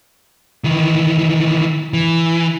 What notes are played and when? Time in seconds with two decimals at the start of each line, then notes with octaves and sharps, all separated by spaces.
0.64 D#3 E3
1.93 E3